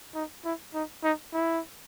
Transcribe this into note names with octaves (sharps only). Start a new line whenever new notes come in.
D#4
E4
D#4
D#4
E4